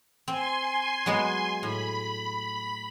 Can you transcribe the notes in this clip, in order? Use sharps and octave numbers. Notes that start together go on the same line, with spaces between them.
C4 G#5 C6
F#3 G#3 B3
A2 B5